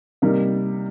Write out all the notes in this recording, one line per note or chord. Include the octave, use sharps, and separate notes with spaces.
C3 G3 A#3 D#4